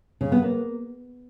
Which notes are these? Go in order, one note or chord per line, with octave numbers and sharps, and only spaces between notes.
C#3
B3
A#3